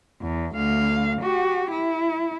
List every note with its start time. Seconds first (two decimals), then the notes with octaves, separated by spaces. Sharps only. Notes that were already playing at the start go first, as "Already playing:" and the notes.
0.22 E2
0.56 D2 F5
1.22 F#4 G4
1.71 E4